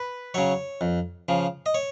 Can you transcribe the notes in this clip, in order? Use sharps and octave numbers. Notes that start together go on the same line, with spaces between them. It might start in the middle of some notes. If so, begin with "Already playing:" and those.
Already playing: B4
C#3 F#3 C#5
F2
C#3 F3
D#5
C#5